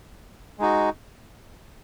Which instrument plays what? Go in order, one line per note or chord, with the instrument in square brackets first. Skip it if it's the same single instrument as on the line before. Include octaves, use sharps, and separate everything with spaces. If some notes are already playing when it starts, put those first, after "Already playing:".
[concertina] G#3 D#4 F#4